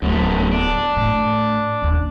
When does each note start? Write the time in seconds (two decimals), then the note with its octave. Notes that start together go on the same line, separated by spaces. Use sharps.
0.02 D1 F#2 B2 A3
0.52 D4
0.96 A2
1.81 D#2 C#4